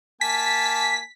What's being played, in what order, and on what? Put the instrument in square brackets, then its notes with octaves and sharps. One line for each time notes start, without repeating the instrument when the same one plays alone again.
[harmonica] A#3 G#5 A5 [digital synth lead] B6